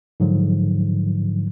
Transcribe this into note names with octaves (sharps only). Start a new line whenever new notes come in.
G#2 D3 F3 F#3